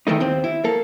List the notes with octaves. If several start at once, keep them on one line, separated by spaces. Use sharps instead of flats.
D#3 E3 A3 D#4
D#2 C4
E4
A#3 A4